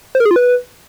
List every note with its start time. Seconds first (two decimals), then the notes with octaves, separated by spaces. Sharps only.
0.15 C5
0.20 A#4
0.25 G#4
0.31 F4
0.36 B4